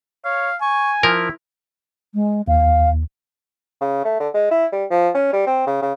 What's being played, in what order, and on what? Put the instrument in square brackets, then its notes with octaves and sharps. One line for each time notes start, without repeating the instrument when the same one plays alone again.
[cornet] C#5 [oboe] F5
[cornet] G#5 [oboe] C#6
[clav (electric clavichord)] F3 A#4 [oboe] E4
[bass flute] G#3
[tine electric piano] D#2 [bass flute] F5
[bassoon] C#3
A3
D3
G#3
E4
G3
F3
C#4
G3
C4
C#3
C#3